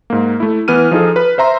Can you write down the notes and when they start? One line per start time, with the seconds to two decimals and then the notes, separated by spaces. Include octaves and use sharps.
0.10 G#2 A#3
0.40 A3 E4
0.68 E3 B3 F6 D#7
0.91 F3 D#4 G#4 A4
1.16 B4 B5
1.38 C5 E5 A#5 C6